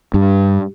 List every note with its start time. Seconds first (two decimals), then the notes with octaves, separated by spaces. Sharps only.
0.14 G2